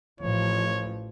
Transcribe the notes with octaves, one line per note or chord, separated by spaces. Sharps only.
A1 F3 C#5